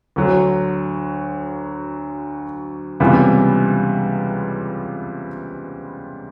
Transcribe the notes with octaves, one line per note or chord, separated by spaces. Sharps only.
D2 D3 F#3
C#2 C3 E3 G3 B3